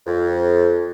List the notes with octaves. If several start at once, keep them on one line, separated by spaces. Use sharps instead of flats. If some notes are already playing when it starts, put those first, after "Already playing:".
F2